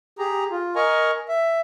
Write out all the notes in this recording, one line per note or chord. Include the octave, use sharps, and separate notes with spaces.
G4 G#4 A#5
F4
A#4 D#5 G#5 A#5 C#6
E5